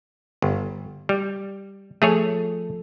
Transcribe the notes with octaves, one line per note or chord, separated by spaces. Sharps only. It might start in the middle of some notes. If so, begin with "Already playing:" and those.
G1
G3
F3 A3 G#4 A4 C#5